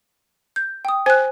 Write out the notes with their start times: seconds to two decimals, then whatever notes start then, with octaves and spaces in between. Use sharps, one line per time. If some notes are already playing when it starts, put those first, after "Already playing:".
0.56 G6
0.85 G5 D#6
1.06 C5 G#5 F#6